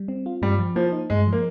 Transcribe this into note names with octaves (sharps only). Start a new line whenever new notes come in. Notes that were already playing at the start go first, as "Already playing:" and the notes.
Already playing: G3
C4
F4
G2 G3
F3
F3 A#3
D#4
G2 G#3
F3
A#3